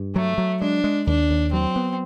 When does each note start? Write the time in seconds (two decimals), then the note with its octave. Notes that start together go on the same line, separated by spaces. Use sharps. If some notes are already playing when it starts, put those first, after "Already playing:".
Already playing: G2
0.15 F#3 A3
0.38 F#3
0.61 G#3 D4
0.84 G#3
1.07 D#2 D4
1.30 D#2
1.53 F#3 C4
1.76 B3